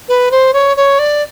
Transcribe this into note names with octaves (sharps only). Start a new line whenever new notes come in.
B4
C5
C#5
C#5
D5